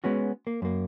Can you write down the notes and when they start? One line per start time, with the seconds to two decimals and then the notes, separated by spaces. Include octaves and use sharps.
0.04 G#3 B3 C#4 F#4
0.47 A#3
0.62 F#2 A#3